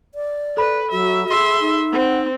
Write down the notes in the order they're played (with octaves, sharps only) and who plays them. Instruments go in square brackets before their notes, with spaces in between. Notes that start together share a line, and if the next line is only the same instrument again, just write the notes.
[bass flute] D5
[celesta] A4 B5 [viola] B4
[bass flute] F#3 [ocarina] F#4 [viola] E5
[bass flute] G#4 [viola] E5 C6
[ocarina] D#4
[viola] C4 [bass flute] F#5